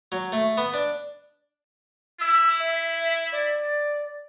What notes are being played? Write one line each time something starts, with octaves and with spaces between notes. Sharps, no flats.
F#3
A3
B3
D4
E4 E6
E5
D5